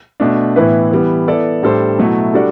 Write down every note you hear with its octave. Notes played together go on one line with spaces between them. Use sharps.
B2 A3 D4
A2 E3 B3 E4 B4
E3 G3 B3
B3 E4 A4 D5
A2 G3 D4 A4 C5
B2 F#3 A3 E4
G3 D4 F#4 A4 D5